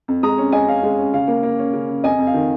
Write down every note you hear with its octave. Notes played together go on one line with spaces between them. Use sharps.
F2
G#3 A#5 D#6
C#4
G#3 D#5 G#5
C#4 F5
G#3
C#4
C#3 F5
A#3
A#3
C#4
C#3
C#3
F2 D#5 G#5
F2
F5
D#3